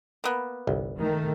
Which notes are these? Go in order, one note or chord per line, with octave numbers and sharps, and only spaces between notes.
A#3 B3
G1 C2
D#3 A3